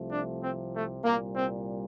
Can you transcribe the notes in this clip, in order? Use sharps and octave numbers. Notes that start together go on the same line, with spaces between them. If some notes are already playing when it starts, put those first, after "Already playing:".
Already playing: C2 C3 F3 A3
D4
C4
A3
C2 A#2 G3 A#3
C4